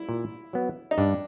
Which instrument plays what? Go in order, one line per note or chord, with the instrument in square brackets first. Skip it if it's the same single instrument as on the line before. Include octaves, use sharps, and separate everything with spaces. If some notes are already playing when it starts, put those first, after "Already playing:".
Already playing: [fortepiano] E4
[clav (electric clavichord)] A#2
F#3 B3
[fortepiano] D#4
[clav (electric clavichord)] G2 [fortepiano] D4